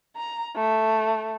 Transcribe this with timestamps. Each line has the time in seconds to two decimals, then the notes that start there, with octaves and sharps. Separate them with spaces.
0.16 A#5
0.56 A3